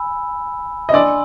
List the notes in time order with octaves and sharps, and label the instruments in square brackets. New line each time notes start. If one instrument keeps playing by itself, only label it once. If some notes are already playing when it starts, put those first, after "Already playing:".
Already playing: [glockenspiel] G#5 B5 E6
[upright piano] D#5
[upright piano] D4 D5 [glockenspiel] G#5 C6 E6